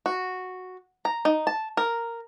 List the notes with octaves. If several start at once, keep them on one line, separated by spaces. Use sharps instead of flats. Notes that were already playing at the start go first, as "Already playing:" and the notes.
F#4
A#5
D#4
A5
A#4